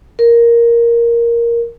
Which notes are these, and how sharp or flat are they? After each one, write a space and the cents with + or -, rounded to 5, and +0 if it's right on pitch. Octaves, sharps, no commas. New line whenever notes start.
A#4 +5